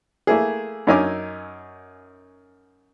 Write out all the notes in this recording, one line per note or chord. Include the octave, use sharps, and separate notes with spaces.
A3 A#3 E4 G#4
F#2 C#4 D#4 E5 G#5 D6